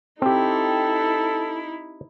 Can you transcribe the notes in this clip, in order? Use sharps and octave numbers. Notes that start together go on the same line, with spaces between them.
C4 D#4 E4 G4 A4